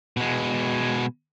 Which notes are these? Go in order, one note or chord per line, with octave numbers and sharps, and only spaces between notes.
B2 G#3